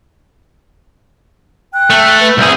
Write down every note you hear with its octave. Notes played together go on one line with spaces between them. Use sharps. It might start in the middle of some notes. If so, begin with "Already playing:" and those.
G5 F#6
A3 A4
B4
C2 G#4 F6 G6